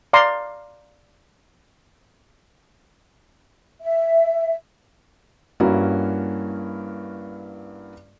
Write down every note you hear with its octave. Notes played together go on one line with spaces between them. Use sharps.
D5 F5 A#5 C6
E5
G2 A#3 C#4 E4 F#4